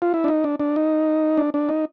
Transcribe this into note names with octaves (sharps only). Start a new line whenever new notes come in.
F4
E4
D4
D#4
D4
D4
D#4
D4
D4
D#4